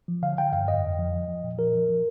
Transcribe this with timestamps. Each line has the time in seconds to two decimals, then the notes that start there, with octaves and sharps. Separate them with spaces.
0.08 F3
0.22 D3 F5
0.38 D3 G5
0.52 G2 F5
0.68 F2 D#5
0.83 F2
0.98 F3
1.13 F3
1.29 F3
1.43 A#2
1.58 F3 A#4
1.74 F3
1.89 F3